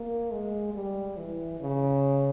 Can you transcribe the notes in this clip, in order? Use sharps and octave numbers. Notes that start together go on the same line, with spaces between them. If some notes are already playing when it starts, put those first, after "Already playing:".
Already playing: A#3
G#3
G3
E3
C#3